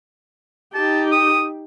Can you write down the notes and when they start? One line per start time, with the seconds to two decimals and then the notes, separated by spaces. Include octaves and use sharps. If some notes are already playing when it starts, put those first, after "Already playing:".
0.74 D#4 G4 A5
1.12 D#6